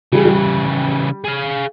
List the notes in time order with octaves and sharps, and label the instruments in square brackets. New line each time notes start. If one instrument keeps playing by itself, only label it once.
[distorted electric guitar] C#3 E3 [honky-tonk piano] G3 G#4
[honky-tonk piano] G3
[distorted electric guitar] G#4 F5